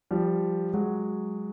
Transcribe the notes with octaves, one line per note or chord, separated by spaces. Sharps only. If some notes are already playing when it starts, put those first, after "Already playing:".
F3 G3
F#3 G#3